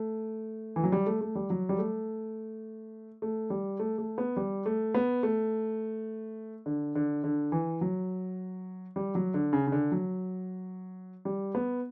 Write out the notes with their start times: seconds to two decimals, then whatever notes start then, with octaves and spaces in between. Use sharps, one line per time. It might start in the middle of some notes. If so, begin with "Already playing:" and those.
Already playing: A3
0.76 E3
0.84 F#3
0.92 G3
1.06 A3
1.21 A3
1.35 G3
1.50 F#3
1.69 G3
1.78 A3
3.22 A3
3.50 G3
3.79 A3
3.98 A3
4.18 B3
4.37 G3
4.66 A3
4.94 B3
5.23 A3
6.66 D3
6.95 D3
7.24 D3
7.52 E3
7.81 F#3
8.96 G3
9.15 F#3
9.34 D3
9.53 C#3
9.67 C#3
9.72 D3
9.92 F#3
11.25 G3
11.55 B3